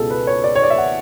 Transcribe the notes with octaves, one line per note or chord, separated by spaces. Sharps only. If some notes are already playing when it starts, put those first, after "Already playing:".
Already playing: C#2 B2 G#4 A4
B4
C#5
D5
C#5
D5
E5
F#5